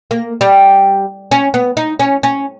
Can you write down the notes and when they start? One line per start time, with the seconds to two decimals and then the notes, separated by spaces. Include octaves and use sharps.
0.11 A#3
0.41 G3
1.31 C#4
1.54 B3
1.77 D#4
1.99 C#4
2.23 C#4